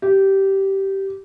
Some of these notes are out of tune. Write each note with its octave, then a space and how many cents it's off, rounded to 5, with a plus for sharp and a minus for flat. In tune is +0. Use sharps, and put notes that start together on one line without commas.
G4 -15